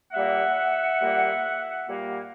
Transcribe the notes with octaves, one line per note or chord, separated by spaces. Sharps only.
A#2 G3 A#3 E5 F#5
A#2 G3 A#3
A#2 G3 A#3